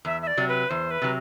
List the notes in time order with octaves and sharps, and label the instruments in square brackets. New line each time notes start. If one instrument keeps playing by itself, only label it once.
[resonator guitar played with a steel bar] E2 [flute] E5
[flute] E5
D5
[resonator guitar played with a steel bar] C3 F#3
[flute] B4
[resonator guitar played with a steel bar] E2 [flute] C5
[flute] B4
[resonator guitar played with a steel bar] C3 F#3